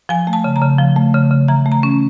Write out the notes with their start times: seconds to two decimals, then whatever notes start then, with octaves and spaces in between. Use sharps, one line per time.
0.09 F3 G#5
0.27 A3
0.33 A5
0.44 C#3
0.56 A#5
0.62 C#3
0.78 F3
0.96 A3
1.14 C#3
1.31 C#3
1.48 E3 A#5
1.66 A3
1.72 A#5
1.83 C#4